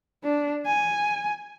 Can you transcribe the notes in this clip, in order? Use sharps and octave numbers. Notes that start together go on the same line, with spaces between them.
D4
G#5